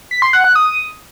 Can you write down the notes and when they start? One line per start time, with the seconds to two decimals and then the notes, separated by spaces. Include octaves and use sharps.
0.11 B6
0.22 C6
0.33 F#5
0.44 F#6
0.55 D#6